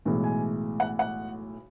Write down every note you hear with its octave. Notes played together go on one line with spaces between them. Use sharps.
B1 A2 E3 G#3
G#5
F#5
F#5